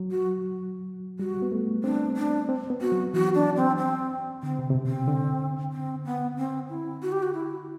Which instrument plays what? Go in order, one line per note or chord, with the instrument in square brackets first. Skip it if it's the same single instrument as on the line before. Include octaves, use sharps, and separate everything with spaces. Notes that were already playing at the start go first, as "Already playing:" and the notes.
Already playing: [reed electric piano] F#3
[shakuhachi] F#4
[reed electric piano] G3 [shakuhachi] F#4
[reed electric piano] B3
A3
[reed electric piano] C4 [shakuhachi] D4
[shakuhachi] D4
[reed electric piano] C4
B3
[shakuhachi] F#4
[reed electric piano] F#3
[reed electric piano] E3 [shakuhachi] F#4
[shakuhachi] D4
C4
C4
[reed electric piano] D3 [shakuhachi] C4
[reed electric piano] C3
C3
B2
[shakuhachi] C4
[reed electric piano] D3
[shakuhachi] C4
B3
C4
E4
F#4
G4
F#4
E4